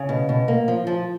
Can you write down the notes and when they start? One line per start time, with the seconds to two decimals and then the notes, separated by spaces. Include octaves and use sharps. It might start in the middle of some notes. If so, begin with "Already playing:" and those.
Already playing: C#3
0.09 B2
0.29 B2
0.48 A#3
0.68 F3
0.87 F3